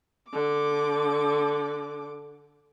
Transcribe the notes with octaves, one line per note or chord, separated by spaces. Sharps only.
D3 D6